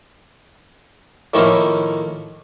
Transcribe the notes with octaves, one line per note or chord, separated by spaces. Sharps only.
A2 D#3 F3 A#3 C#4 E4